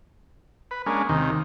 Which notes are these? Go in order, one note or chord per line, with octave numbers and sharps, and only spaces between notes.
B4
G#3 A#3 C#4 D4
D#2 C3 D#3